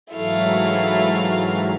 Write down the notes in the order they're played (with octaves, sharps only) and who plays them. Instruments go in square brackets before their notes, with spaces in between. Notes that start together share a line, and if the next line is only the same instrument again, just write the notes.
[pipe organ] G#2 E3 F#3 [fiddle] A3 F5 [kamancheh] E4